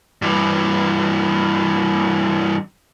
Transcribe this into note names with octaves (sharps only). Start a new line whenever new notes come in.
G2 E3